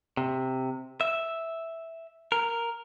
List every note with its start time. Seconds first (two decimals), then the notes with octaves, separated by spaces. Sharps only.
0.17 C3
1.01 E5
2.32 A#4